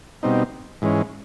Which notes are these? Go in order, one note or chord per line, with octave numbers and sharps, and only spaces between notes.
B2 G3 C4 D#4
G#2 E3 G#3 C#4